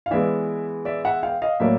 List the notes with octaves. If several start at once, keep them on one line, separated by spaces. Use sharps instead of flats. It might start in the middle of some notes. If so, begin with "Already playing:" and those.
F5
E3 G#3 B3 D5 E5
D5 E5
E5 F#5
F5 G5
D#5 F5
A2 F#3 A#3 D5 E5